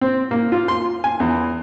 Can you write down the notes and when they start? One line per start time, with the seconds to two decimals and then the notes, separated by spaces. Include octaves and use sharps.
0.01 C4
0.31 A#3
0.52 F4
0.68 C6
1.04 G#5
1.20 E2